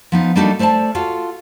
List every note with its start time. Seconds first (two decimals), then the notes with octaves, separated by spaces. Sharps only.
0.12 F3 B3 D#4
0.36 G3 A#3 D4 D#4 F#4 A4
0.59 A3 C5 D5 F5 A5
0.95 F4 F#4 A4 F5